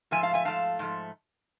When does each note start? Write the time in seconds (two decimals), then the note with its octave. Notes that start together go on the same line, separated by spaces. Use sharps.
0.11 G#2 F3 A3 E5 G#5
0.23 F5 A5
0.34 E5 G#5
0.45 G#2 F3 A3 F5 A5
0.79 G#2 F3 A3